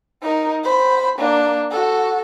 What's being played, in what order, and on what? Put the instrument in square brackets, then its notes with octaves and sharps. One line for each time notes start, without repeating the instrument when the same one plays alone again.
[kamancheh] D#4 A#4
C5 B5
A#3 D4
F#4 A4